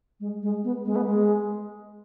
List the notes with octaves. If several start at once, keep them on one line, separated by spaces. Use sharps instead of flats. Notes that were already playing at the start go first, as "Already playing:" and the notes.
G#3
G#3
B3
G#3
B3
G#3